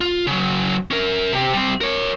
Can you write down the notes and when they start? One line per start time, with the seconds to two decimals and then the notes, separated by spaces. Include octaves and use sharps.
0.01 F4
0.27 C#3 F#3
0.91 C#4 A#4
1.32 C3 G4
1.53 G3 C4
1.81 A#4 C#5